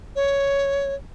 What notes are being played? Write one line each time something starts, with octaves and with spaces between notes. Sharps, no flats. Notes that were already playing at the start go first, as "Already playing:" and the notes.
C#5